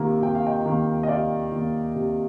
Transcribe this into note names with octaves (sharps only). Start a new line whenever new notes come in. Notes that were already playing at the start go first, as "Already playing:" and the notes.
Already playing: C3 D#3 A#3
C3 G5
F5
D#5 G5
D#3 A#3
D#5
C3 D5 F5
D#3 A#3
C3